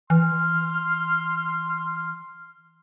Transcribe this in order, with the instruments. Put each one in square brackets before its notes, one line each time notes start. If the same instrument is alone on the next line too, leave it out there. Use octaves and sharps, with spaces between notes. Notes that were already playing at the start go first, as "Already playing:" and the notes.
[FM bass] E3 [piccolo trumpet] C6 [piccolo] F6